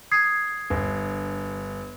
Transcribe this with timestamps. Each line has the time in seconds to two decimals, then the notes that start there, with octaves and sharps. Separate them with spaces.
0.11 D#6 G#6 C7
0.70 G1